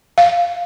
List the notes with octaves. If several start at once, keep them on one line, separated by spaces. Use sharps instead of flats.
F5